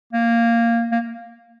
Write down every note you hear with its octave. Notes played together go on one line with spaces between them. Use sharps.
A#3
A#3